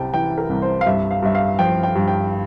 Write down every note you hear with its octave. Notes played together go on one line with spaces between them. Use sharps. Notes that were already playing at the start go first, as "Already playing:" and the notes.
Already playing: C2 C3 G5 A5
E3 G5
A#4
C2
C5
F5
G2 E5
F5
G2 E5
F5
F3 G5
G5
G2
G5